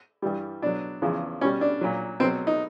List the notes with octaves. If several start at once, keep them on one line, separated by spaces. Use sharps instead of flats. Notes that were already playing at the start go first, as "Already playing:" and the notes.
G2 E3 G3
B2 F#3 D4
E2 C#3 F3
B2 G3 C#4
D4
A#2 F#3
B2 F#3 C4
D#4